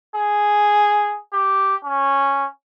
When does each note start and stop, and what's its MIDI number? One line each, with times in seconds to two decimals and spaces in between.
0.15 1.18 68
1.33 1.75 67
1.84 2.46 61